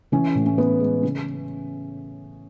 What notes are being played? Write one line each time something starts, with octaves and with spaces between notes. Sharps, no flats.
E3 C#4
A2
C#4
B3
G#3
C#3 C#4